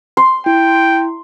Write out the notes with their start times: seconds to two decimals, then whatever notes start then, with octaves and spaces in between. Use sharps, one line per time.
0.17 C6
0.46 E4 G5